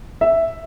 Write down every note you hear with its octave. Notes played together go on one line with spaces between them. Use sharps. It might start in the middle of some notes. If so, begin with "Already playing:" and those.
E5